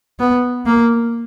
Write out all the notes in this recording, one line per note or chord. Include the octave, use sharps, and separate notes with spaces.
B3
A#3